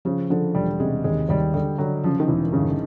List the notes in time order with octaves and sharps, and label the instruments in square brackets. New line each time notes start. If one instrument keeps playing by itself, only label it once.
[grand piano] C#3 [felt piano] F3
[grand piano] D3 [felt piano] F3
[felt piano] E1 [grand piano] G3
[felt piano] C3 [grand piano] G#3
[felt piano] D#2 [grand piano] G#3
[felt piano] D#2 [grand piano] G3
[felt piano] D3 [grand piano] G3
[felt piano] D3 [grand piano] F#3
[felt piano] C#3 [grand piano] F3
[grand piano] D#3
[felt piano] E1 [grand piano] E3
[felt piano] G1 [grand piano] C#3